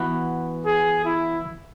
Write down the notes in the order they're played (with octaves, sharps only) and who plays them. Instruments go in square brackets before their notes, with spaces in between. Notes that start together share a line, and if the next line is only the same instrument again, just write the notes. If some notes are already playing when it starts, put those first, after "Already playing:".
Already playing: [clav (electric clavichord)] E3 B3 F#4 B4
[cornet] G#4
E4